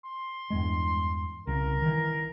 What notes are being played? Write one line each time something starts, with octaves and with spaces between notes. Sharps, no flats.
C6
E2 G2 G#3
C2 C#3 A#4
D#3 E3